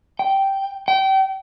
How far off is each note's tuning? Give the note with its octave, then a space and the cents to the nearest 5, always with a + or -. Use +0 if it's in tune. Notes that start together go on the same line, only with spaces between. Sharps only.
G5 -10
G5 -30